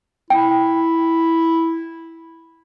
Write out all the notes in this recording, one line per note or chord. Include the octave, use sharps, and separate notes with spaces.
E4 G5